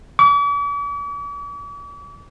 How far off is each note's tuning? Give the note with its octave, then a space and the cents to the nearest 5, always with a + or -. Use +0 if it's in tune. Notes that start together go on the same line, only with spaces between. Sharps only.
D6 -45